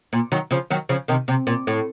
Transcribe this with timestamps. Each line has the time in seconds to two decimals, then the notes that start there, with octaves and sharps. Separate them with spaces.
0.13 A#2
0.32 D#3 F#3
0.51 C#3 F3
0.70 D#3 F#3
0.89 C#3 F3
1.08 C3 D#3
1.28 C3
1.47 A#2
1.67 A2